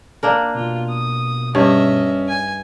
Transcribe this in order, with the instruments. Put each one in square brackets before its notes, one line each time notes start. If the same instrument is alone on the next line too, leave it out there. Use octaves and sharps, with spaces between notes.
[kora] A#3 D4 A#4
[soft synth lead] B2 [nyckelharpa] F4
[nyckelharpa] D#6
[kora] G2 [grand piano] C#4 [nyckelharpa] D#5 E5
[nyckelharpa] G#5